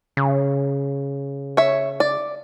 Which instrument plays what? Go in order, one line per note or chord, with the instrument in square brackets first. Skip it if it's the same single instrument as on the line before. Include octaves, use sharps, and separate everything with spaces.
[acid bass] C#3
[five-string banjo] C#5 E5
D5